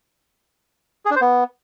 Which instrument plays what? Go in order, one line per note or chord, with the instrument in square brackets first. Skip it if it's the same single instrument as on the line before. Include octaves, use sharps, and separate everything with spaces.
[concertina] G#4
D4
C5
B3